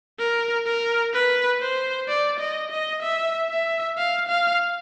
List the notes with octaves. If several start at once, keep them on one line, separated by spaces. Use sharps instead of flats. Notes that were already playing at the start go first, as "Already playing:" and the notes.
A#4
A#4
B4
C5
D5
D#5
D#5
E5
E5
F5
F5